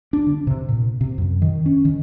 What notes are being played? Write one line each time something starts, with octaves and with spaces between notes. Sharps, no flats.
D4
D3
C3
A#2
C3
F#2
D#3
C#4
D#3